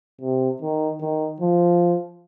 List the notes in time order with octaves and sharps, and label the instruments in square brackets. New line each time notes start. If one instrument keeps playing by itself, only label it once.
[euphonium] C3
D#3
D#3
F3